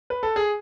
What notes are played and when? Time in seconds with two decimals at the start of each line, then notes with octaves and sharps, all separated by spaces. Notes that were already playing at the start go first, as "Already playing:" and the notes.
0.10 B4
0.23 A4
0.36 G#4